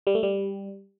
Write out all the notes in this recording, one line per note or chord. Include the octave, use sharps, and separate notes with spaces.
G3
A3
G3